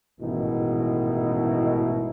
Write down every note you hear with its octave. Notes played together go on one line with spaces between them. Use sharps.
A1 G#2 B2 D#3 D#4 E4